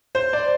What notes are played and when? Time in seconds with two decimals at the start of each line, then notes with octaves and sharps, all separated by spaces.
0.15 C5
0.33 D5